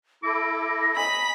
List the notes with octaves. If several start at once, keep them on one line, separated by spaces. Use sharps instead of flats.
E4 A4 D6 A#6
D#5 G#5 B5